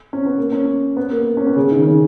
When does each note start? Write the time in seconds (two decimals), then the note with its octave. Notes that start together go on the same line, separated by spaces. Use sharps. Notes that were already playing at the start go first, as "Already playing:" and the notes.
0.13 C#4
0.26 B3
0.38 A#3
0.52 C#4
0.97 B3
1.11 A#3
1.37 C#4
1.47 B3
1.56 C#3
1.71 D#3
1.87 C#3